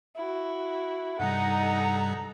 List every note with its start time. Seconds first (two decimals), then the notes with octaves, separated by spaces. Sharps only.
0.16 E4 F#4
1.20 G2 C3 G3 D#4 A4 F#5 A#5